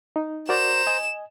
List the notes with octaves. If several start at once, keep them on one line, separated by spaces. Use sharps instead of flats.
D#4
F#4 A#4 C5 D5 A#5 E7
D#5 G#5